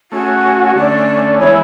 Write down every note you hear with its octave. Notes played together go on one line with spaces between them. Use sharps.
A3 C#4 F#4 G#4
D3 A3 C#4 D5
E3 G#3 B3 E4 C#5